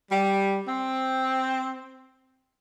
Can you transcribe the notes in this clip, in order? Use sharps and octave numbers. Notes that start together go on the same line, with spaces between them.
G3
C4